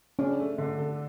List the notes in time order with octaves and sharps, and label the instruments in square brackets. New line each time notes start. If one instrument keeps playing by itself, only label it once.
[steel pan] C#4 [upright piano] D4
[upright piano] A3
D3
A4